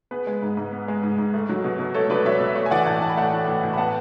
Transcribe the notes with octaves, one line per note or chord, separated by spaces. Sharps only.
B3 G#4 B4
G#3
G#2
G#2
B3
G#3
G#2
G#2
A3
F#3
B2
B2
A3 A4 C#5
F#3 B4 D5
B2 C#5 E5
B2
A3 C#5 E5
G#5
E3 D5 F#5
A2 F#5 A5
A2 A5
B5
A3 F#5 A5
E3
A2
A2
B5
B3 F#5 A5